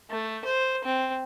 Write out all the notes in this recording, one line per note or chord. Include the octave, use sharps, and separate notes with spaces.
A3
C5
C4